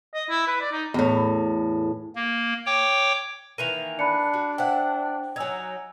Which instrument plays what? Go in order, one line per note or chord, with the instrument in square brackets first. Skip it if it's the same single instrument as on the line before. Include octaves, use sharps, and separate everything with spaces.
[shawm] D#5
E4
B4
D5
D#4
[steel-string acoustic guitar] E2 A2
[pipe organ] A#3
C#5 G5 D6
[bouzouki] D#3 E3 A#3 [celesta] D#7 F7
[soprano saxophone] D4 [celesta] B5 F#6 C#7
[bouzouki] F#4
[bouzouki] E4 F#5 [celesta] C5 G5
[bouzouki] F#3 D#4 [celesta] G#5 E6 G#6